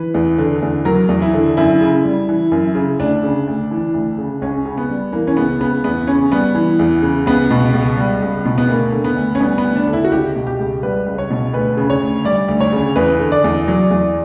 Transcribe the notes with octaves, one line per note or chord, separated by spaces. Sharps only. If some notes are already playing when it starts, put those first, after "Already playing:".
Already playing: E3 B4
E2
D3
E2
F#3 A#4
E2
E4
D3
F#2 E4
C#3
G3
E3
F#2
C#3
D2 D4
C#3
D2
E3
D2
C#3
C#2 C#4
C#3
B3
G3
E3 A#3
C#4
C#2 B3
C#3 B3
E2 B3
C#3 C#4
G3 B3
E3
E2
C#3
C#2 B3
B2
C#2
G3
C#2
B2
B3
D2 A#3
D3
B3
D2
C#4
G3 B3
B3
D2
D4
D3
E4
F#4
C#2 G4
B2
G4
C#2
G3 B4
C#2
C#5
B2
D2 B4
C#3
C#5
D2
G3 D5
D2
C#5
C#3
E2 B4
D3
D5
E2
F#3
E2